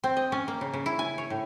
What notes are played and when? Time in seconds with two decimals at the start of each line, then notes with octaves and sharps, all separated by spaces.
0.04 C4
0.17 D#5
0.32 C#4
0.48 A#3
0.61 C#3
0.74 C#3
0.86 E4
0.99 G#5
1.18 C#5
1.30 A2